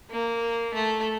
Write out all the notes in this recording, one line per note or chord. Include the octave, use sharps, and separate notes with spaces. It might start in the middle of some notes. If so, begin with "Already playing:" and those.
A#3
A3